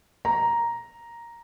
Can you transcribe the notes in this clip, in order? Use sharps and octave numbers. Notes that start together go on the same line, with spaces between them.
A#5